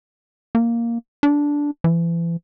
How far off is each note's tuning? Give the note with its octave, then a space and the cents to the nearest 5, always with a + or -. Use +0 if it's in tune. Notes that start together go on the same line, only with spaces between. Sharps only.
A#3 +0
D4 -10
E3 +35